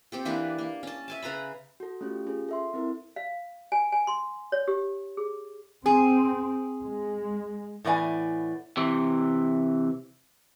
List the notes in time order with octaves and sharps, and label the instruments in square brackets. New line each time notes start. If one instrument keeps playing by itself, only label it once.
[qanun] C4 G4 A4
E3 A#3 D4 B4
A#3
C#4 A5
E5 G#5 A5
C#3 B4 A#5 B5
[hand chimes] F#4 A4
A3 C#4 F4 G4
C#4 F4 G#4
A4 E5 C6
C4 E4 A#4
[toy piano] F5
G#5
G#5
C6
C#5
G4
G#4
[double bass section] C4 [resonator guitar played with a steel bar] G#4
[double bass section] G#3
[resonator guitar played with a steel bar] A2 E3 B3 D5 G#5
[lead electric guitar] C3 E3